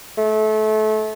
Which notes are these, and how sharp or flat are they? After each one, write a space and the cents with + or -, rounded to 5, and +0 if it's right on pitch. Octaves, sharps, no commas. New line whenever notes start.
A3 -25